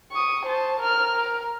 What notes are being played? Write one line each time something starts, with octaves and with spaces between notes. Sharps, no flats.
C#6 D#6
C5 A5
A#4 F6
A#4